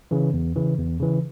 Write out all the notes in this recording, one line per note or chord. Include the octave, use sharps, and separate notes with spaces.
C#3 E3
E2
C#3 E3
E2
C#3 E3